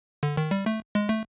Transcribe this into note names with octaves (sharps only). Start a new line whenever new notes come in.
D3
D#3
G3
A3
G#3
A3